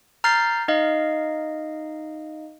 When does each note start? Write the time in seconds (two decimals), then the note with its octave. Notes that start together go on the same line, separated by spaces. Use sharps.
0.24 A#5 F6 G6 A6 C7
0.68 D#4 D#5 F5